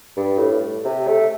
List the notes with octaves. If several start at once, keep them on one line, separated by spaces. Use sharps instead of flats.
G2
A2
C3
A3